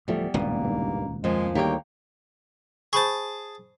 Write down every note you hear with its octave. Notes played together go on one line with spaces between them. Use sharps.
D1 E2 F3 G3 A3
D#1 C#2 G2 B2 A#3
G2 D#3
F2 A#2 F3 G#3
D2 D#3 G3 A#3 G4 C#5 G5
G#4 C5 A5 B5 C#6